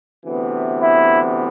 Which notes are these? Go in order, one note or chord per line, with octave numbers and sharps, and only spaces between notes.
D2 C3 E3 B3
E4